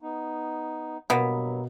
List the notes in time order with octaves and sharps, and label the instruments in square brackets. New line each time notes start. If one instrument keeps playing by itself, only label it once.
[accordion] B3 D#4
[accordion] G2 F#3 [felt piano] B2 [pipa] A#3 B3